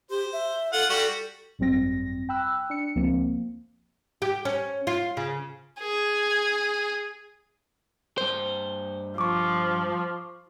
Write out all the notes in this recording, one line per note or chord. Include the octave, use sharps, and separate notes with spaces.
G4 C5
E5
F4 A4 F#5
G3 F#4 A4
G#1 F#2 G3 C4 A#6
G5 B5 E6 F#6
D4 C#7
C#2 F3 A#3 C4
G4
C#4
F4
C#3
G#4
G2 C5
F3 C#6 D6